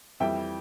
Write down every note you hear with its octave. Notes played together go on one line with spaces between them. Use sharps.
F2 E3 G3 E5 G5